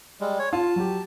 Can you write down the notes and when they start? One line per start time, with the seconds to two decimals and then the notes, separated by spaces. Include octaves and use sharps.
0.21 G3 G#3
0.39 C#5
0.53 F4 A5
0.76 F#3 G4